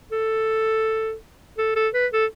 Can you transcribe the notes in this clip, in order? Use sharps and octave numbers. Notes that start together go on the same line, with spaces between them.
A4
A4
A4
B4
A4